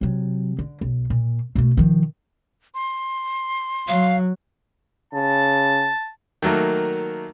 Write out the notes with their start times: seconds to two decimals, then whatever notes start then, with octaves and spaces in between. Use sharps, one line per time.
0.01 C3 F#3
0.59 D3
0.81 B1
1.10 A#2
1.55 B2 A3
1.77 D#3 F3
2.75 C6
3.88 F#3 F5
5.13 C#3 A5
6.42 D#3 F#3 A3 A#3